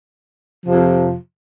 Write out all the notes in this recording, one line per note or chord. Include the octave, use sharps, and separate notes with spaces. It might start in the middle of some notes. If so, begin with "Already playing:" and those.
F2 C3 F3